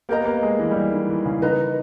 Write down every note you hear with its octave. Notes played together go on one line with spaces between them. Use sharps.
A#3 G4 A#4 D#5 A#5
B3
A#3
G#3
E3
G3
E3
D#3
E3
C#3
D#3 B4 D#5 A#5